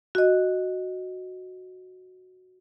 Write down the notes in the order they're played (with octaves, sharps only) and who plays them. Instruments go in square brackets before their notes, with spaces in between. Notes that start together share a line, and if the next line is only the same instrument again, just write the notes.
[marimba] F#4 D#5